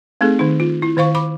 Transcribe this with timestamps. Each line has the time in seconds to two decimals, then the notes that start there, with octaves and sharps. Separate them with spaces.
0.21 A3 C4 D#4 G#4 A4
0.39 D#3 D#4
0.60 F4
0.82 E4
0.97 D#3 C5 F5 C#6
1.15 B5 D6